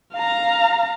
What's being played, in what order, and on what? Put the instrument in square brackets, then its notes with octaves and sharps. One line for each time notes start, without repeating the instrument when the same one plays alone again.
[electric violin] F5 A#5